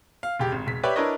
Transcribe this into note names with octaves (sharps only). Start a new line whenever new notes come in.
F5
E1 G4
G#1
E1 B6
G4 B4 C#5 D5 E5
D4 E4 A#4 B4 C#5 D#5